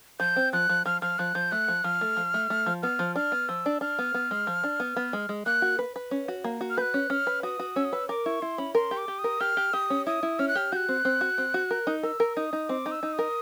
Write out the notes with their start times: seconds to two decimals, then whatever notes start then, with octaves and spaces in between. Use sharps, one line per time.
0.20 F3 G6
0.36 C4
0.53 F3 F#6
0.69 F3
0.86 F3 F6
1.02 F3 F6
1.19 F3 F#6
1.35 F3 G6
1.52 A3 F#6
1.68 F3
1.84 F3 F6
2.01 A3
2.17 F3
2.34 A3
2.50 A3
2.66 F3
2.83 B3 F6
2.99 F3
3.16 D4 F6
3.32 B3
3.49 F3 E6
3.66 D4
3.81 D4 F6
3.99 B3
4.14 B3
4.31 G#3
4.47 F3
4.64 D4
4.80 B3
4.96 B3
5.13 G#3
5.29 G#3
5.46 A#3 F#6
5.62 F#4
5.79 B4
5.96 B4
6.11 C#4
6.28 F#4
6.44 A#3
6.61 F#4
6.70 F6
6.78 B4 G6
6.81 F#6
6.94 C#4
7.10 C#4 F6
7.27 B4
7.43 F#4 D#6
7.59 F#4
7.76 C#4 E6
7.85 D#6
7.93 B4 E6
8.09 A#4 D6
8.26 E4 C#6
8.42 E4 C6
8.58 C#4 B5
8.75 A#4 C6
8.91 G4
8.97 D6
9.08 G4
9.19 D#6
9.24 A#4
9.40 G4 F6
9.57 G4
9.73 G4 D#6
9.90 C#4
10.06 E4 D#6
10.23 E4
10.39 C#4 F6
10.48 F#6
10.55 G4 F6
10.72 F#4 F#6 G6
10.89 C4
11.05 C4
11.21 F#4
11.38 C4
11.54 F#4
11.71 A#4
11.87 D#4
12.03 A#4 E6
12.20 A#4
12.37 D#4 D#6
12.53 D#4
12.69 C4 D6
12.86 D#4
12.91 E6
13.03 D#4
13.13 D#6
13.19 A#4